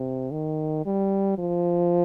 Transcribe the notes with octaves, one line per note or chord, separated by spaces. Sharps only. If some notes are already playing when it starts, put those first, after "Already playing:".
Already playing: C3
D#3
G3
F3